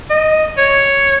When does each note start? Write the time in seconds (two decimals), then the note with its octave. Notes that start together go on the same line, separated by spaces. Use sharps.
0.10 D#5
0.58 C#5